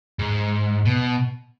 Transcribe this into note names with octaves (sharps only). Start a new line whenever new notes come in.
G#2
B2